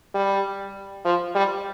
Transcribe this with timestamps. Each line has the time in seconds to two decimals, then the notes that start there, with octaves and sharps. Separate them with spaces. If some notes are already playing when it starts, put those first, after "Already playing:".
0.14 G3
1.05 F3
1.35 G3